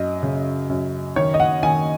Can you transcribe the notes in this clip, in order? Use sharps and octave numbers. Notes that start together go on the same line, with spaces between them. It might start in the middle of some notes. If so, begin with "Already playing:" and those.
Already playing: F#2 D#5
C#3
F#2
D#3 C#5
D#5
F#5
D#3 G#5